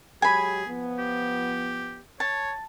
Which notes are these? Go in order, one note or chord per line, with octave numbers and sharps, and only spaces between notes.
F#3 G#3 G4 G#4 G#5 B5
F3 B3
G4
C#5 A5